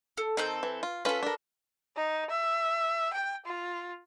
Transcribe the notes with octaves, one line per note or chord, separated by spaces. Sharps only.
A4
D#3 C4 A4 G6
E3
F4
C#4 F4 A4 B4
D4 A#4
D#4
E5
G5
F4